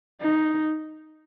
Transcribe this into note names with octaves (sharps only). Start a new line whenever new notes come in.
D#4